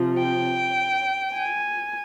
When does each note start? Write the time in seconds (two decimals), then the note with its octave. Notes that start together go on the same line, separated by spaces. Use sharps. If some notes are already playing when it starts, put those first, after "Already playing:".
Already playing: C3 F3
0.19 G5
1.36 G#5